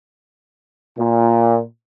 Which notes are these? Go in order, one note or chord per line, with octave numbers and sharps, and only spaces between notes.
A#2